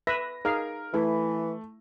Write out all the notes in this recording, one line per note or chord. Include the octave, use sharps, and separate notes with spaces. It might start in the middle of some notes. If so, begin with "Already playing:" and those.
B4 E5 A#6
D#4 G#4 A#4 F5
E3 A3 E4